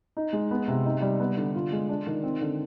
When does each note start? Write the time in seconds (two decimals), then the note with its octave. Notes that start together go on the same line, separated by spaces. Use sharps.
0.17 D#4
0.33 G#3
0.51 B3
0.68 C3
0.85 D#4
1.02 G3
1.20 B3
1.37 D3
1.55 F4
1.72 G#3
1.89 D4
2.07 D#3
2.23 C4
2.41 D3